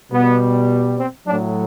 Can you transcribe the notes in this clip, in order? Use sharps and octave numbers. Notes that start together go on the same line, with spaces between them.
B2 G3 B3
C4
A2 F#3 D4